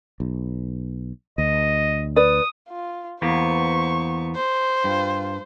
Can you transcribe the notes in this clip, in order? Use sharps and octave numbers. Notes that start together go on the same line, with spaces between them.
B1
D2 D#5
B4 D5 D#6
F4
E2 A#3 B3 C5 C#6
C5
G2 F4